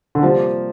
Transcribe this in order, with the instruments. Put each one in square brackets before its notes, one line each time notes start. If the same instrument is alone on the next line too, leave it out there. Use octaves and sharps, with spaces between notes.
[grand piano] D3
[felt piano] C3 G3 A#3 [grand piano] F3